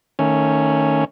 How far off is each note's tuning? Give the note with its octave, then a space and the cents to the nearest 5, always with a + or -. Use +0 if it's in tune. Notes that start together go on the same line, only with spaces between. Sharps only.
D#3 +0 A3 +20 C#4 +0